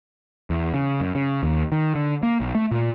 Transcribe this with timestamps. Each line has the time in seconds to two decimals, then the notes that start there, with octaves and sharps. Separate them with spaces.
0.50 E2
0.74 C#3
1.01 F#2
1.15 C#3
1.43 D#2
1.72 D#3
1.95 D3
2.23 A#3
2.40 B1
2.55 A3
2.71 A#2